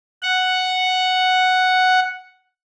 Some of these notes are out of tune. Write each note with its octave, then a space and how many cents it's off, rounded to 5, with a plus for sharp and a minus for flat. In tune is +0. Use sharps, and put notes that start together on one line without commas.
F#5 +0